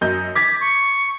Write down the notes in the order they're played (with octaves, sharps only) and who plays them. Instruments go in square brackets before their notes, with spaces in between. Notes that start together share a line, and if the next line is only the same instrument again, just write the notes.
[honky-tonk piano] F#2 D#5 G6
[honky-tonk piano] D6 G#6 A6 [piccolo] B6
[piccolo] C#6